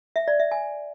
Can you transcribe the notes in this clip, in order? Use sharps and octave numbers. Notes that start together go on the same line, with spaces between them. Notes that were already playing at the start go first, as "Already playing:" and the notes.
E5
D5
E5
G#5